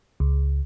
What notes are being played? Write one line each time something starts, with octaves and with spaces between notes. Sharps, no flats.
C#2